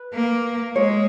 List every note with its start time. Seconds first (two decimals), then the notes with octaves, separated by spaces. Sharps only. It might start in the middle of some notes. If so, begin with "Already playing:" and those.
Already playing: B4
0.14 A#3
0.76 G#3 C#5